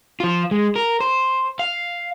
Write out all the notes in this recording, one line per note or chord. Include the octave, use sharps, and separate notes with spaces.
F3 F4
G#3
A#4
C5
F5